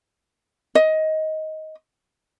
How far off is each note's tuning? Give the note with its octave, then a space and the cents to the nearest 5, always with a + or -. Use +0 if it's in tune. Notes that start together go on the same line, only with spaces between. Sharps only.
D#5 +15